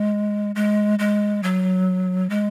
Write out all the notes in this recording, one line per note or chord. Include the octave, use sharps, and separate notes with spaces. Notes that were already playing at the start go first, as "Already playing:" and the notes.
Already playing: G#3
G#3
G#3
F#3
G#3